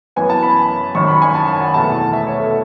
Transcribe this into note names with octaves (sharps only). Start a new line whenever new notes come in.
F#2 E3 B3 G#5
A5
B5
G#1 F#2 D#3 C#6
B5
G#5
A5
A5
F#5
E2 B2 A3 A5
E5
C#5
A4